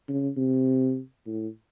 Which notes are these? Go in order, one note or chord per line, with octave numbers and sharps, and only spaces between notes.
C#3
C3
A2